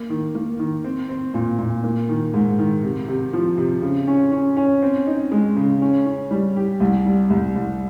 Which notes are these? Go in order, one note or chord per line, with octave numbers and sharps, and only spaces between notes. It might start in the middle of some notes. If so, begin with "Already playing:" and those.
Already playing: A#3
D#3
A#3
D#3
C4
C4
A#2
A#2
A#3
D#3
G#2
D#3
C3
C3
F3
C3
C#3
C#4
C#4
C#4
C4
D#4
G#3
C#3
C#4
C#4
G3
G4
C2
G3
C2
C2